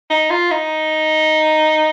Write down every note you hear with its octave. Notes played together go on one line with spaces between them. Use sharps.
D#4
F4
D#4